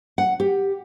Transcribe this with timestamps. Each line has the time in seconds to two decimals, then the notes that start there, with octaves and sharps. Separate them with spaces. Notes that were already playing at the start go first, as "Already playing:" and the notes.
0.18 F#5
0.40 G4